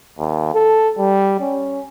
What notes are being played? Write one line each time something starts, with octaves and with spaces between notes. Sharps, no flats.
D#2
A4
G3
C#4